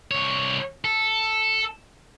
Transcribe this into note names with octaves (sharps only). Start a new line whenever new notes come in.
C2 C#5
A4